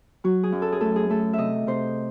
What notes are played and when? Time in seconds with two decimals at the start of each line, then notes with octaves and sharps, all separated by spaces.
0.24 F#3 F#4
0.43 G#4
0.52 F#2
0.62 A4
0.72 G#4
0.81 A3 A4
0.96 G#4
1.10 A3 A4
1.33 C3 D#5 E5
1.67 C3 C5